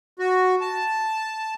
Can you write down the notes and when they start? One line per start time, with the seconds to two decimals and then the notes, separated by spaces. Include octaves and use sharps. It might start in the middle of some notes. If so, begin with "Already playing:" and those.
0.19 F#4
0.61 A5